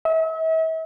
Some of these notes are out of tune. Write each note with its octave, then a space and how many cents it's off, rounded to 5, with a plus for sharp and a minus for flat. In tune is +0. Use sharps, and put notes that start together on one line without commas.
E5 -40